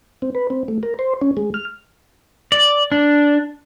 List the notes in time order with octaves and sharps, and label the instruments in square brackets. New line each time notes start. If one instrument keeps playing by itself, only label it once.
[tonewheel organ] C4
B4
C4
A3
A#4
C5
C#4
G#3
F6
[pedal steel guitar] D5
D4